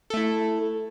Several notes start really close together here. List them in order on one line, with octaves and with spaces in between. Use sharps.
A4 A3 E4